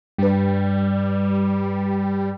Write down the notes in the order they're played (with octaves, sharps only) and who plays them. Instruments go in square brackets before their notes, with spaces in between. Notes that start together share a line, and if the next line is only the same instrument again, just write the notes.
[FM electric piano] G2 B4 [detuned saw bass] G3